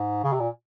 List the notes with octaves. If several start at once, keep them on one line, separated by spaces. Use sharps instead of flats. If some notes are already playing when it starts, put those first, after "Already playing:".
Already playing: G#2
C#3
C3
A#2